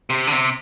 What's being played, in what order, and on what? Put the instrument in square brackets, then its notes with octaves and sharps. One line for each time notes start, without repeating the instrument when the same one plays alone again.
[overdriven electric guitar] C3
D3
C3